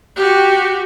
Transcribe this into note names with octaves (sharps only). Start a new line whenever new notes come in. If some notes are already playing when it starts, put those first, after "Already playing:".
F#4 G4